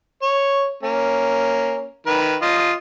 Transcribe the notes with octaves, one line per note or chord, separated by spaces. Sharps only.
C#5
A#3 C#4
D#3 B4
F4 D#5 D#6